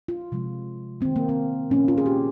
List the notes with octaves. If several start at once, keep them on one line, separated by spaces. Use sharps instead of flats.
F4
C3 F3 G#3
D#3 A#3 C4
A#3
C4
A#2 F3 A#3 C#4
F4
G#4
G4